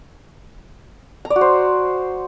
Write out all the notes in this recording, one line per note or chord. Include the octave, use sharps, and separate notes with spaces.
A#5
D5
F#4
C5